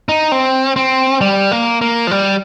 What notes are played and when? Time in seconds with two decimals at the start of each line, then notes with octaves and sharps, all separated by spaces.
0.09 D#4
0.32 C4
0.76 C4
1.21 G3
1.52 A#3
1.81 A#3
2.07 F3
2.11 G3